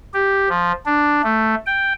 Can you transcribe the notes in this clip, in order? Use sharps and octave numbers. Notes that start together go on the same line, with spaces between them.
G4
F3
D4
A3
G5